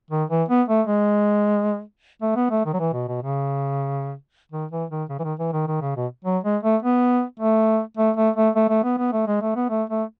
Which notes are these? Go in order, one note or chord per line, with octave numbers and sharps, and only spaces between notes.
D#3
E3
B3
A3
G#3
A3
B3
A3
D#3
F#3
E3
B2
B2
C#3
D#3
E3
D#3
C#3
E3
D#3
E3
D#3
D#3
C#3
B2
F#3
G#3
A3
B3
A3
A3
A3
A3
A3
A3
B3
B3
A3
G#3
A3
B3
A3
A3